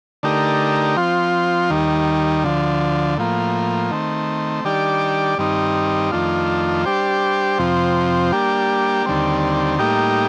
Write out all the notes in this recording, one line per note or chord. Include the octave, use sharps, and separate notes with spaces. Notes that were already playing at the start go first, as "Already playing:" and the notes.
D3 A3 D#4 G4 A#4
F3 C4 F4
D#2 D#3 G3
D2 D3 F3
A2 F3 A#3
D#3 A3 C4
D#3 G3 D4 G4 D5
G2 D#3 G3 C4 D#4
F2 D#3 A3 D4 F4
G3 D4 G4 C5
F2 C3 F3 C4
G3 A#3 D4 G4
D#2 D3 G3 C4
A2 G3 A#3 D#4 G4